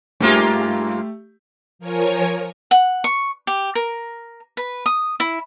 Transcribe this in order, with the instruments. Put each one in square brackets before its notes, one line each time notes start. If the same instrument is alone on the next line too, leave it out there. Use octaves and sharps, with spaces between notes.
[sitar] G2 A#3 F4 [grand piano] A3 G4
[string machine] F3 A#4 C#5 G#5
[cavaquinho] F#5
C#6
G4
A#4
B4
D#6
E4